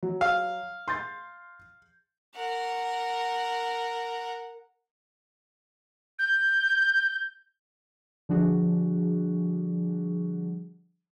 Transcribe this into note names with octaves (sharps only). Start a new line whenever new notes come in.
F#3
F5
C6 G6 A6
A#4 F#5
G6
D3 F3 G3 D4 F#4 G#4